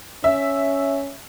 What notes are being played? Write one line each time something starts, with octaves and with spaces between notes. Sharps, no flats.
C#4 E5